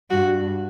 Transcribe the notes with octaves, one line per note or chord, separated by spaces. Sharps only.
G2 F#4